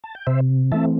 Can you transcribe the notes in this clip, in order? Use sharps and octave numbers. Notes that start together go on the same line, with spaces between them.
A5
G5
C3 C5 E5
E3 A3 C4 E5 A5